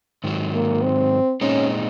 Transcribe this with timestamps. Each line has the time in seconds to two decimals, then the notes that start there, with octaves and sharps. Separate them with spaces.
0.24 G#2 D#3 F#3
0.54 A#3
0.83 C4
1.41 A#2 G#3 C4 C#4 D#4